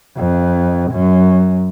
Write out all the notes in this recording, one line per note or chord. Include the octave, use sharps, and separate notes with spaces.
F2
F#2